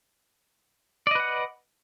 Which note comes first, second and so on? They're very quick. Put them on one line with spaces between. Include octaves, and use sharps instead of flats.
D5 D#5 B4 F#5